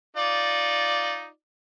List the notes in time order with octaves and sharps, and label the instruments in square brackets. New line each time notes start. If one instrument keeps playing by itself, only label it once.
[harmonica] D#4 F4 D5